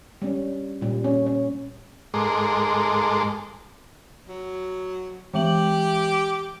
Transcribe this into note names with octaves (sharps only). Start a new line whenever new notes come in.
G3 C#4
A#2 G3
C#4
C#4
G#2 G#3 A4 A#4 C6 D6
F#3
E3 G#3 G4 F#7